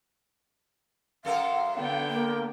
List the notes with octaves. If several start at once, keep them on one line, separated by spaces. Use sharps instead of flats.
F#2 A4 A#4 F5
D3 B3 G5
A#3